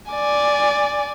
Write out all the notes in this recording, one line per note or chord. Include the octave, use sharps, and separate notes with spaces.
D5 G#5